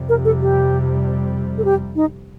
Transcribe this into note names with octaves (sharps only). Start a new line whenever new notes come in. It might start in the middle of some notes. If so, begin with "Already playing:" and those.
Already playing: F2 C3 G3
A#4
A4
G4
A4
G4
D#4